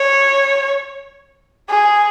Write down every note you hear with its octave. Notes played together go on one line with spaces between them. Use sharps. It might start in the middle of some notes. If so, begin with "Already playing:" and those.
Already playing: C#5
G#4